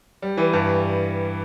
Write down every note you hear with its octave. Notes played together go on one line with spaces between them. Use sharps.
G3
E3
G2